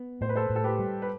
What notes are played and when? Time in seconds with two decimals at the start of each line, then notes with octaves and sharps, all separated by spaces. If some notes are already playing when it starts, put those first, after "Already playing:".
Already playing: B3
0.21 A2 C5
0.29 B4
0.35 A4 C5
0.50 A2
0.56 A4
0.64 G4 B4
0.79 G3
1.02 B4